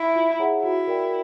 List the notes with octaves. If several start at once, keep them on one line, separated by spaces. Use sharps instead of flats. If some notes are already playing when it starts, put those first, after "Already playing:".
Already playing: E4
F4
G#4 C#5 F#5 A#5
E4 F#4
A#4 D5 G5